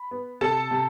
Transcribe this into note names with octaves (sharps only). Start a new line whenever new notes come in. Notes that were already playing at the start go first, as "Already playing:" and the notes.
Already playing: B5
B3
C3 A4 A5
C3